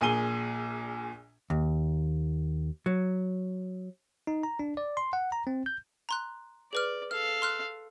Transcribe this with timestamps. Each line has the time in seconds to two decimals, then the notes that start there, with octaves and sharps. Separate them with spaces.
0.01 A#1 A#2 G#4 G#5 D#7 G7
1.50 D#2
2.86 F#3
4.27 D#4
4.43 A#5
4.59 D4
4.77 D5
4.97 C6
5.13 F#5
5.32 A#5
5.47 C4
5.66 G6
6.09 A#5 C6 F#6
6.73 G#4 B4 D5 F6
7.11 A4 F5 F6
7.42 C6 F6 F#6